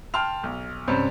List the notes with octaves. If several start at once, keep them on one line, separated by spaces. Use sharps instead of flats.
G5 A5 C6 F6 F7
B1
G2 C3 G3 C#4 C5